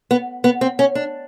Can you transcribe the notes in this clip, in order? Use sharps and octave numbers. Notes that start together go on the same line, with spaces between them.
B3
B3
C4
C#4
D4